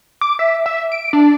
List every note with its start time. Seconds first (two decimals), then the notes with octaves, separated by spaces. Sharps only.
0.21 D6
0.39 E5
0.66 E5
0.92 D7
1.13 D4